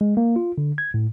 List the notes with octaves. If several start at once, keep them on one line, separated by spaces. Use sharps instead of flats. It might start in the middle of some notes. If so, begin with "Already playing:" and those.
G#3
A#3
F4
D3
G#6
A2